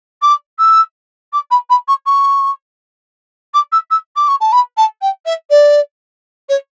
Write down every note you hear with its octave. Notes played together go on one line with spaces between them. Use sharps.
D6
E6
D6
B5
B5
C#6
C#6
D6
E6
E6
D6
C#6
A5
B5
A5
G5
E5
D5
C#5